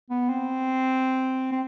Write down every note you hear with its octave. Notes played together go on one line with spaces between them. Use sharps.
B3
C4
C4